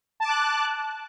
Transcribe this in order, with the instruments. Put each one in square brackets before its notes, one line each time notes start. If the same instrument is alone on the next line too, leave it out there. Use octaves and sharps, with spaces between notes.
[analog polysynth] A5
D6
F#6